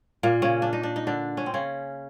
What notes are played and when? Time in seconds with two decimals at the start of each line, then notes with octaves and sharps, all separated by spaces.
0.23 A#2 A#3
0.42 C#3 C#4
0.62 D4
0.73 D#4
0.83 D4
0.96 D#4
1.07 D3 D4
1.37 C#4
1.46 C4
1.54 C#3 C#4